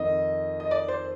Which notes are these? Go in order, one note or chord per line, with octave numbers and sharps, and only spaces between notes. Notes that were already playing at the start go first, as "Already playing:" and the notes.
Already playing: F2 D#3 D#5
D#5
D5
C5